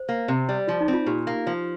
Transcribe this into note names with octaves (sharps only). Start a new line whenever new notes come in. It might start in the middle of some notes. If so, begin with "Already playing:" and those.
Already playing: C5
A#3
C3
G3
F3 F4
D#4
C4
F4
A#2 G4
A#3
F3